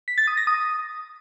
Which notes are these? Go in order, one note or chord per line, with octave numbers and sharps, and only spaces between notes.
B6
A6
D#6
A#6
D#6